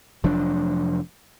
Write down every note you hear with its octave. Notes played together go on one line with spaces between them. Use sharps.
F1 F3 F#3 D4